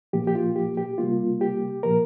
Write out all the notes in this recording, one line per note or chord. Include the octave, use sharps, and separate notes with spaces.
A#2 F3 A#3 G4
G4
F4
G4
G4
C3 G3 A#3 F4
G4
A#2 F3 A#3 A#4